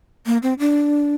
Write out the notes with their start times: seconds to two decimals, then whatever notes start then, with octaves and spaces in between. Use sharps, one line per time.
0.26 A#3
0.43 C4
0.59 D4